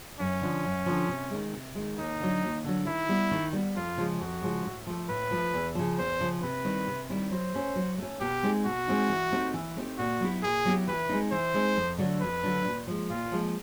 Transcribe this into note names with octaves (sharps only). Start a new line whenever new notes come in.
F#2 C#4
D3 F3
F#2
D3 F3
C3
D#3 G#3
C3
D#3 G#3
D#2 D#4
D3 F#3
D#2
D3 F#3
D#3 E4
G3 B3
D#3
G3 B3
F2 F4
C#3 F3 G#3
F2 F#4
C#3 F3 G#3
A2
F3 A3
A2 B4
F3 A3
E2
C#3 F3
E2 C5
C#3 F3
C3 B4
D#3 G3 C4 E4
C3
D#3 G3 C4 E4
F#3 C5
A3 C#4
F#3
A3 C#4
B2 G4
G#3 C4 D#4
B2 F#4
G#3 C4 D#4
E3
A3 C4 D#4 G4
E3
A3 C4 D#4 G4
A#2 F#4
F#3 B3 E4 G4
A#2 G#4
F#3 B3 E4 G4
E3 B4
G#3 C4 D#4
E3 C5
G#3 C4 D#4
F2
D3 F#3 A3 D4
F2 B4
D3 F#3 A3 D4
A#2
F3 G#3
A#2 F4
F3 G#3